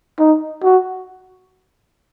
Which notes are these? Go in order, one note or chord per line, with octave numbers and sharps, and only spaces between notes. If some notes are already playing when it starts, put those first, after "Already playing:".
D#4
F#4